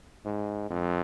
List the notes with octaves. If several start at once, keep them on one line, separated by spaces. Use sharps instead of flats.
G#2
F2